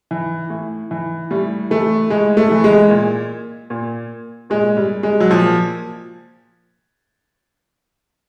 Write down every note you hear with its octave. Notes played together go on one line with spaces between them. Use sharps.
E3
A2
E3
A2 G3
E3 A3
A2 G#3
A3
E3
G#3
A#2
A#2
A#2 G#3
G3
G#3
F#3
A#2 F3